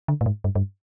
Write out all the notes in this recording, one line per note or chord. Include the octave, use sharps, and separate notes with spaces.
D3
A2
G#2
G2
G2